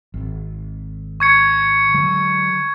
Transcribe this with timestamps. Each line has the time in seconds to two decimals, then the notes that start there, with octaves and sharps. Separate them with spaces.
0.14 G#1
1.20 C#6 G#6 C#7
1.94 D3 F#3 G#3